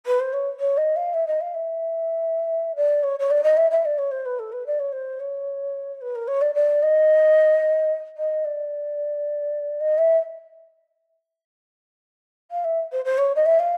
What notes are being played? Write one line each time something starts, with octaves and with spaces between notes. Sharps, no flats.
B4
C5
C#5
C#5
D#5
F5
E5
D#5
F5
E5
D5
C#5
C#5
D5
D#5
E5
E5
D5
C#5
C5
B4
A4
B4
D5
C#5
C5
C#5
B4
A#4
C#5
D5
D5
D#5
D#5
D5
D#5
E5
F5
E5
C5
C5
C#5
D#5
E5
F5